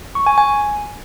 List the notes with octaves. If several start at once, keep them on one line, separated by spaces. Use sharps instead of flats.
C#6
G#5
G#5